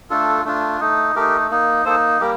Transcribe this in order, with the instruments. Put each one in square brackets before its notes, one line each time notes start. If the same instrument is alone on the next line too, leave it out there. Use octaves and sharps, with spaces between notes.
[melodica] A3 D4 F4 A4
A3 D4 F4
A3 D#4
A3 D#4 G4 A#4
A#3 D#4
A#3 D#4 A4 C5
G3 A#3 G4 A#4